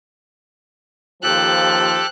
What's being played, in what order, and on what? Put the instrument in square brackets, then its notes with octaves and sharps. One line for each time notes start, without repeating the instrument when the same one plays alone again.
[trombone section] D#2 F3 [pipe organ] G4 A4 [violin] C5 F#6